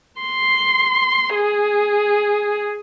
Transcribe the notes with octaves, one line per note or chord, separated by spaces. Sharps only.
C6
G#4